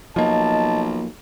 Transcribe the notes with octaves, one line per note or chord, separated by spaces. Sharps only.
B1 F3 A#3 D#5 A5